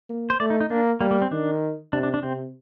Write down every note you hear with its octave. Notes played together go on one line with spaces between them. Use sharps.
A#3
C5
A3 D5
D#4
D#4
A#3 D4
G3 A#3
A#3
C4
D#3 D4
C3 D4
D4
D4
C3 C4